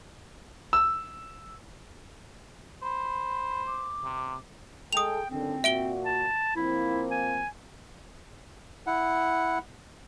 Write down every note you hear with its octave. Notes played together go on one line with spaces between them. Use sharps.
E6
C5 B5
D6
C3
G#3 G#4 A4 G5 D#6 F7
F#1 D#2 D3 C4
A#2 F#4 E5 D7 G7
A5
F3 A#3 C4 E4
G#5
E4 F#5